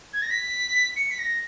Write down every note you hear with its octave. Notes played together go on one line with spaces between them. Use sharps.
G#6
A#6
B6
C#7
B6
A#6